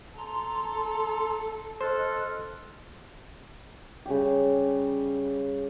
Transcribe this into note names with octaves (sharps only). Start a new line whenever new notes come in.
A4 A#5 C6
A4 C5 D#5 F6 F#6
C#3 G3 G4